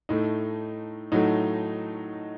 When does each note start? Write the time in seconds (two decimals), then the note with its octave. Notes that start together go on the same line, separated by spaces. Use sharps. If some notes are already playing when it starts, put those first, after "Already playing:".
0.09 A2 A3 D#4
1.12 A2 F#3 A3 D#4